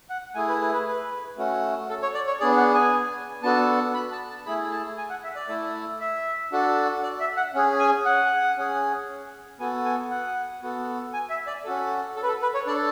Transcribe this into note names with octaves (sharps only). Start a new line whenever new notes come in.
F#5
A3 E4 G#4 G#5
B4
B4
B4
B4
A3 C#4 F#4
A4
C#5
D5
C#5
B3 D4 G#4 D5
F#5
G#5
B3 D4 F#4 A4 A5
B5
A5
A5
A3 E4 G#4 B5
A5
G#5
F#5
E5
D5
A3 E4 A4
E5
D4 F#4 A4
D5
E5
F#5
C#4 G#4
G#5
F#5
C#4 G#4
B3 F#4 A4 G#5
G#5
F#5
B3 F#4 A4
G#5
E5
D5
C#4 F#4 A4
A4
B4
A4
B4
C#5
D4 A4 D5